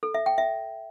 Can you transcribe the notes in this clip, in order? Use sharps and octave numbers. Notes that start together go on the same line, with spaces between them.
A4
E5
G5
E5